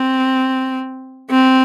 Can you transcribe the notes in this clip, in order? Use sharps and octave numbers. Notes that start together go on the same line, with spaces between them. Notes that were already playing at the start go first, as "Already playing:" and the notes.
Already playing: C4
C4